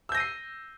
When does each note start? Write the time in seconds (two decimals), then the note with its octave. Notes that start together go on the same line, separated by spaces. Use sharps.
0.09 E6
0.12 G6
0.15 A#6
0.17 D#7
0.20 C7